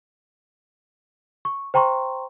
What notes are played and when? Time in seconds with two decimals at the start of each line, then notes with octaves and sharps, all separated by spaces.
1.45 C#6
1.74 C5 G5 A#5 C6 C#6